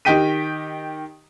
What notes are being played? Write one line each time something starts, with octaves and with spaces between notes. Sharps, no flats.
D#3 G4 D#5 G5 B6 D#7